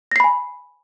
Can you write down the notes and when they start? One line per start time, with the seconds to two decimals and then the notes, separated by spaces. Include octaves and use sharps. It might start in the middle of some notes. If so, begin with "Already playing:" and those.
0.12 A#6
0.16 C7
0.20 B5
0.24 G#5